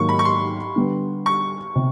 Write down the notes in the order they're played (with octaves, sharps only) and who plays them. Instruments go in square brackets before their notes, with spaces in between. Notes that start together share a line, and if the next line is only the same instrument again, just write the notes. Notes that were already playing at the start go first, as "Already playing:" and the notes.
Already playing: [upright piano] G#2 D#3 F#3 A#3 [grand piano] C#6
[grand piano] B5
C#6
C6
[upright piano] D3 G3 B3
[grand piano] C#6
[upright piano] C3